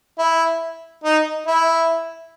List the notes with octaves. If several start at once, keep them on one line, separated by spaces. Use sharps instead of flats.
E4
D#4
E4